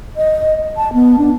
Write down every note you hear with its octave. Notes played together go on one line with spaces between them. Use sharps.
D#5
A5
B3
D4